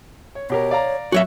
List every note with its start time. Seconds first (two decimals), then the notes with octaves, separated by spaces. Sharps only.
0.35 C#5
0.50 B2 G4 A#4 C#5
0.71 D5 F5 A#5
1.12 F#3 F#4 C#5 E5